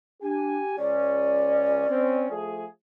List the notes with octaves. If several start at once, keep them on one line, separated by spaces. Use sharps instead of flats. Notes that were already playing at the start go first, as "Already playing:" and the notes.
D4 G4 G#5
C#2 C#4 D5
C4 C#4
F3 A3 G#4